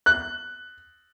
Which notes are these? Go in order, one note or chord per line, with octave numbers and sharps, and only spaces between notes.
F#6